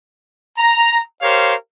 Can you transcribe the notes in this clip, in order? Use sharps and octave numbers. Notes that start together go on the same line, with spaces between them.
A#5
G4 A#4 C5 C#5 F5